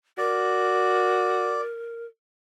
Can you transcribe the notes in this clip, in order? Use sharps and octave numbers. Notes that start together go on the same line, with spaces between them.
F#4 A#4 D5